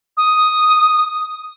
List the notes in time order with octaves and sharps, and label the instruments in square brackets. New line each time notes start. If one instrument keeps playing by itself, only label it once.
[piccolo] D#6